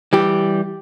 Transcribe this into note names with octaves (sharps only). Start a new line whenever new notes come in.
E3 G3 G4